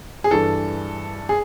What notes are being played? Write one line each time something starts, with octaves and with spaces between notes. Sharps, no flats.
G#4
G2 E3 A4
G#4